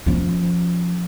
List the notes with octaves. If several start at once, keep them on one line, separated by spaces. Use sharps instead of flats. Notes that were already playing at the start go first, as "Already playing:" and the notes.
F3 C#4